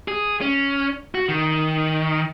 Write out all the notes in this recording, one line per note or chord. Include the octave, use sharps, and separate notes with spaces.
G#4
C#4
F#4
D#3